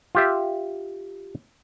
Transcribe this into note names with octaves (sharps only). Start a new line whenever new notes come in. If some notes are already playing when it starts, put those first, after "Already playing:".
F4 G4 E5